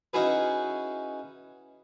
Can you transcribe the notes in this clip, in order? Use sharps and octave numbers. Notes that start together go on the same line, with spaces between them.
C#4 D#4 E4 F#4 G#4 B4